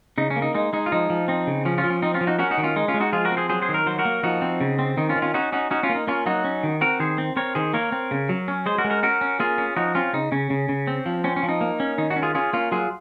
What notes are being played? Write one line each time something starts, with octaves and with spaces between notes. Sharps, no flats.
C#3 D#4
C#4
A#3
D#4
G#3 D#4
G#3 D#4
F4
F3 D#4
F3
C4 D#4
C#3
F3 C#4
C#4 F4
F3
C#4
C4 D#4
C#4 F4
F3
D#4 F#4
C#4 F#4 A#4
D#4 F#4
D#3
C#4 F4
G#3 D#4
C#4 F4
G#3
D#4 F#4
F3 F4 G#4
F#4 A#4
C4
G#4 C5
F#3 G#4 C5
G#4 C5
D#3
A#4
F#3 C5
F#4 A#4
A#3
F3 D#4 F#4
C4
C#3
C4
D#3 D#4
C#4 F4
D#3
C#4 F4
C#4 D#4 F#4
C#4 D#4 F#4
C#4 D#4 F#4
C#4 F4
A#3
D#4
A#3 C#4 F4
F#3 D#4 F#4
C#4
D#3
C4 F#4 A#4
D#3 G#4 C5
C4
C4 A#4 C#5
D#3 G#4 C5
A#3 A#4 C#5
C4
C#3
F#3
C#4
G#3 G#4 C5
F#4 A#4
G#3
F#4 A#4
C#4 F#4 A#4
C#4
A#3 F4 G#4
C#4
F3 D#4 F#4
C4 C#4 F4
C#3 D#4
C#3 C#4
C#3
C#3
C4
F3
C4 C#4
C#4
F3
D#4
A#3
C#4
D#3 D#4
D#4 F#4
C#4
F4 G#4
C#4 F4 G#4
A#3 C#4 F4
F#3 F4 G#4